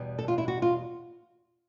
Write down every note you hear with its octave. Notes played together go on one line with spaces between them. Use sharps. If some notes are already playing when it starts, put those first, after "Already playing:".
Already playing: E2 B2 G3
A4
F4
E4
F#4
F4